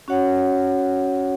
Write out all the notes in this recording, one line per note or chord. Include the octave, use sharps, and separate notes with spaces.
C#4 F#4 C#5 F#5